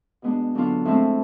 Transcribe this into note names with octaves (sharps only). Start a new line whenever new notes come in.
B2 G#3 B3 D4
D3 F#3 B3 D4 F4
A2 F3 G#3 C4 E4